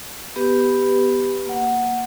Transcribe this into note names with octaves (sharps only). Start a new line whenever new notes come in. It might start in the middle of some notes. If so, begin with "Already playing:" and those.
B3 G4 B4
A#3 F#5